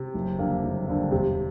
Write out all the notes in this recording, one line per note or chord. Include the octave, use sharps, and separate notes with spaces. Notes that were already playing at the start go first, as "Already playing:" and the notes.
Already playing: C3
F#1
F2 D3 G3 A#3
F#1
F2 D3 G3 A#3
E1 C3